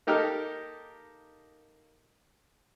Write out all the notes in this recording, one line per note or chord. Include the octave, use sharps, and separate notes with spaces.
A#3 D#4 G4 A4 A#4 F6